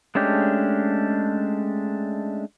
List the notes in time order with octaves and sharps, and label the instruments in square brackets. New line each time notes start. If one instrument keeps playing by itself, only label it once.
[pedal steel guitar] G#3 A3 C#4 D4 G4